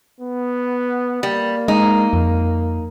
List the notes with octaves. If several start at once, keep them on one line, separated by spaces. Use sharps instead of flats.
B3
G3 A#3
G#3 D#4
F2